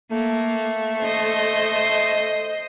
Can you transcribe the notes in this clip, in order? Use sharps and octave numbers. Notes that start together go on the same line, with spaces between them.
A3 A#3
C5 D#5